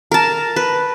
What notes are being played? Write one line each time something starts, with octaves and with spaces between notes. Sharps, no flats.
A#4 A5
B4